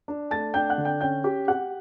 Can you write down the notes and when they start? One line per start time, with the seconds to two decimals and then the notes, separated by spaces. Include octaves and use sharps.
0.08 D4
0.31 A3 A5 A6
0.54 D4 G5 G6
0.70 F#5 F#6
0.78 D3
0.85 G5 G6
1.01 C#4 G5 G6
1.24 G4
1.48 G4 F#5 F#6